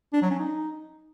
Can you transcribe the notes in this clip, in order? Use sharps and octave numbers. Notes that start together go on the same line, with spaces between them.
D4
F#3
C#4
D#4